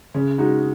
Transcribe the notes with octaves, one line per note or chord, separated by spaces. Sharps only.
C#3
G#3 D#4 F#4